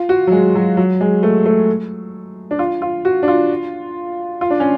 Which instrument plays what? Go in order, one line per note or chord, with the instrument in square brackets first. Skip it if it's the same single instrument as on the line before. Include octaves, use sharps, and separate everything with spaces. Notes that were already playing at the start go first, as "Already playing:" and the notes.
Already playing: [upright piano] F4
F#4
F#3
G#3
F#3
F#3
G#3
A3
A3
D4
F4
F4
F#4
D4
F4
F4
D4
C#4